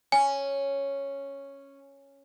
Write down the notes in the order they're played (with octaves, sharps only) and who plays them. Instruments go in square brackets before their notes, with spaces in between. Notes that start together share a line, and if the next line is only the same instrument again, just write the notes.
[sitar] C#4 [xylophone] G#5